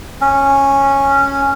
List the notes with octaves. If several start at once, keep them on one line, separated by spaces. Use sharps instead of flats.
C#4